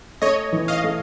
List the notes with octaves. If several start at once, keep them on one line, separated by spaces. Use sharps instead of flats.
A3 C#5 D#5
E3
D#5 F5
A3